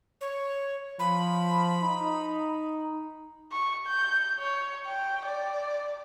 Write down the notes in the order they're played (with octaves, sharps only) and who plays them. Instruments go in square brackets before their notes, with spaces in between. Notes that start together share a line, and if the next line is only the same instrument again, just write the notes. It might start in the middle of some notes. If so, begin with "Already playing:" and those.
[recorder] C#5
[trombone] F3 [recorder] B5
[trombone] D#4
[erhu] C#6
G6
C#5
G5
D5